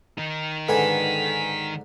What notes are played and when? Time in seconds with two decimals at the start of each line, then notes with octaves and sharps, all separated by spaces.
0.18 D#3 D#4
0.69 G#2 D3 A4 B4 G#5 B6